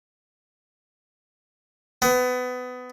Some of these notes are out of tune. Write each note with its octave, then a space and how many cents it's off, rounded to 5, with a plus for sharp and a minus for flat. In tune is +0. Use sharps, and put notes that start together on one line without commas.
B3 +25